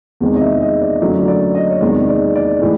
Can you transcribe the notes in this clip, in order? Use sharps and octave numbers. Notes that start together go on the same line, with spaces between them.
E2 C3 D#3 G#3
D#5
E5
D#5
D5
F#2 D3 F#3 A3 D5
D5
D#5
C#5
E2 C3 D#3 G#3 D5
D5
D5
A2 E3 G#3